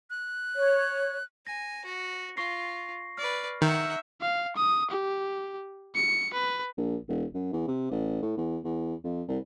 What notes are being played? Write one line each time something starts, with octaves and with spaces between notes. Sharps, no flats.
F#6
C#5
G#5 A#6
F#4
F4 C#6 A#6 C7
B4 D5 F6
D#3 D#4 E5 F#5 G6
F5
D#6
G4
C#7
B4
A#1
E1
F#2
E2
C3
A1
A2
E2
E2
F2
C2